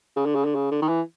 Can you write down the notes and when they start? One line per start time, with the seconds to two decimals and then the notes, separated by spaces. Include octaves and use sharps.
0.16 C#3
0.26 D3
0.35 C#3
0.45 D3
0.55 C#3
0.71 D3
0.82 D#3
0.88 E3